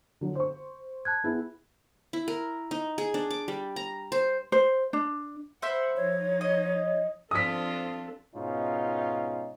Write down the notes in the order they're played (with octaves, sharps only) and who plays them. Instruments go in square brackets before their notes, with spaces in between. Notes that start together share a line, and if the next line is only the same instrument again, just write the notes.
[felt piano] D3 F#3
C5 C#6
[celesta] A5 F#6 G#6
[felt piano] B3 E4 G#4
[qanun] E4
A#4
D#4
G#4
D4
D6
G3
A#5
C5
[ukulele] C5
D4
[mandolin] C5 E5 B5 [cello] F#5
[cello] F3 D#4 [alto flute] C#5
[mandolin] D#5
[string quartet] F3 D4 F4 [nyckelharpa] C4 A4 [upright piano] D#6 B6
[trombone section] G#2 B2 C#4 D#4 F4